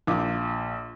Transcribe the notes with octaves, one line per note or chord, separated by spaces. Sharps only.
A#1 F4 D6